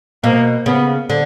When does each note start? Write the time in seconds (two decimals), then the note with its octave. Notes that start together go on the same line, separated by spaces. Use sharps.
0.23 B2 A#3
0.66 C#3 B3
1.10 D3